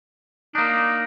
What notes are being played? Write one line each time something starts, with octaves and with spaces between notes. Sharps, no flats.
A#3 D4 D#4